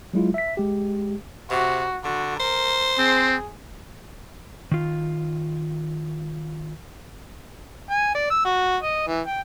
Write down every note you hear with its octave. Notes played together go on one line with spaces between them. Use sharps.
F#3 G#3 E4 F4
E5 B6
G#3 G4
C3 F#4
D3 F#4
A#4 C5
C4 G#4
D#3 F4
G#5
D5
E6
F#4
D#5
E3
G5